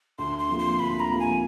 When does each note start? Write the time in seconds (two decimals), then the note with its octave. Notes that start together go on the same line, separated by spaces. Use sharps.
0.19 D2 C6
0.39 C6
0.49 C3 F3 A#3
0.59 C6
0.79 D2 B5
1.00 A#5
1.09 C3 F3 A#3
1.20 G#5